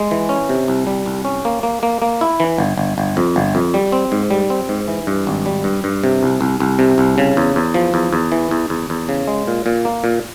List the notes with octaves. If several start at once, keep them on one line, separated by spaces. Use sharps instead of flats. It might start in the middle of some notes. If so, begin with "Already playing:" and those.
Already playing: G#3
E3
C#4
C3
C2
G3
C2
C#4
A#3
A#3
A#3
A#3
E4
E3
G1
G1
G1
F2
G1
F2
G3
C4
G#2
G3
C4
G#2
E3
G2
G#1
G3
G2
G2
C3
C2
C2
C2
C3
C2
C#3
E2
E2
F3
E2
E2
E3
E2
E2
E2
C#3
G#3
A#2
A#2
A#3
A#2